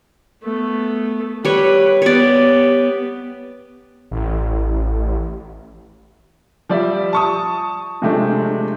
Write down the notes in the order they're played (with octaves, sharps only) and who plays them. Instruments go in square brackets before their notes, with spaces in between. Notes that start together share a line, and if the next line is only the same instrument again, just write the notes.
[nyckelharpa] A3 B3
[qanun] G3 C#5 [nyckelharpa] B4
[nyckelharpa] B3 G4 [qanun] C#5 D5
[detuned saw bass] A1
[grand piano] F3 G3 D5 E5
A5 C#6 D#6
C3 F3 G#3 A3 C4 D4